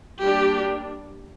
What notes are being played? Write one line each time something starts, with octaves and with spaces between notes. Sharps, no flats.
G3 A#3 D4 G4